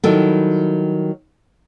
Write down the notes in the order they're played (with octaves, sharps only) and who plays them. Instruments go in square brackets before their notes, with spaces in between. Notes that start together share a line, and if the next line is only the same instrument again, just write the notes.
[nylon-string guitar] D#3 F#3 G3 E4 A4